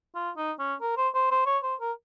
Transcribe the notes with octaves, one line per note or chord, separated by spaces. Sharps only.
F4
D#4
C#4
A#4
C5
C5
C5
C#5
C5
A#4